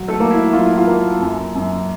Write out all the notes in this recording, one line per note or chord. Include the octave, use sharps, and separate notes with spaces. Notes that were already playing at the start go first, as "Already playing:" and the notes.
Already playing: F#3
A3 A4
A#3
E4
F#3 F4
E4
F4
A#3
F#2
F#2